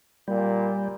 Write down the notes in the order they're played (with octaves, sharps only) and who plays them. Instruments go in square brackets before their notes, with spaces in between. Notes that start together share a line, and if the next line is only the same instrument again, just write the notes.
[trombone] A#2 [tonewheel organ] G3